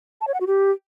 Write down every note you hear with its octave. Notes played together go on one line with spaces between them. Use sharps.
A5
C#5
F#5
F#4
G4